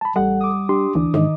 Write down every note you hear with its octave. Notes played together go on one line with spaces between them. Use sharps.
A5 B5
A1 G3 A4 F#5
D6 D#6
D4 G4 C6
D2 E3 D4
G#2 D#3 D#4 D#5